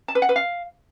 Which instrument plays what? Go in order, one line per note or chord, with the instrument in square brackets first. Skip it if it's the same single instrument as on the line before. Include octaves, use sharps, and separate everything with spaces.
[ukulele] A5
B4
F#5
B4
F5